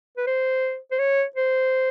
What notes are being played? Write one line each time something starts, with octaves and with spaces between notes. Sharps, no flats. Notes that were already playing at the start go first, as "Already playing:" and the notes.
B4
C5
C5
C#5
C5